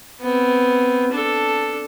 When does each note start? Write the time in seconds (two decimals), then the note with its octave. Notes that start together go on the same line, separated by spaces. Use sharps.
0.21 B3 C4
1.12 D4 A4